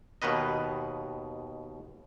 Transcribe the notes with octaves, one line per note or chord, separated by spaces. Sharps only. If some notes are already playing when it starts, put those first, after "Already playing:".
D#2 B2 D#3 B4 D#5